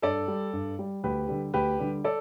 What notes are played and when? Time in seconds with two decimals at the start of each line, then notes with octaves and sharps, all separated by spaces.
0.02 G2 A4 D5
0.28 G3
0.53 G2
0.79 G3
1.03 D2 G4 B4
1.28 D3 G3
1.54 D2 G4 B4
1.79 D3 G3
2.04 A4 D5